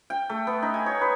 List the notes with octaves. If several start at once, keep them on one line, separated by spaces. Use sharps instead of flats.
G5
A3
B3
D#4
G#5
C#5
B4